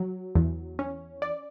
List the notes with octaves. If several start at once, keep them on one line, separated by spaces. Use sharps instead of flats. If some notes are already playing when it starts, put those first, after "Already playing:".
Already playing: F#3
E2
C#4
D5